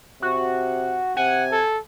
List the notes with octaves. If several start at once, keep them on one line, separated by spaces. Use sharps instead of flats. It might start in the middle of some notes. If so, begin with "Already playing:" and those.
C3 F#4
C3 F#5 G#5
A4